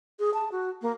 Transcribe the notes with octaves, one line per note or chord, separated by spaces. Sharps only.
G#4
A5
F#4
A#3